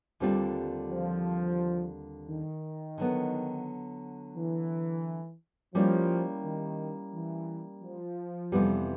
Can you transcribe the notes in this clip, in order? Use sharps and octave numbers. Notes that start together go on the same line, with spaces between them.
D#2 D3 G3 C4 F4
F3
D#3
D3 F#3 B3
E3
F3 G3 A#3 C#4 E4 G4
D#3
E3
F3
F2 C3 E3 G3 B3